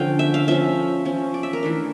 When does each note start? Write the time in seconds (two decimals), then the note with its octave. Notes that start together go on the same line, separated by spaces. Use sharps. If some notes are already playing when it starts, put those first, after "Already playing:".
Already playing: D3 F3 C#4 F5 G5
0.19 E5
0.34 F5
0.48 F3 C#4 E5
1.05 F3 C#4
1.34 D5
1.43 E5
1.53 A#4
1.63 E3 A3 D4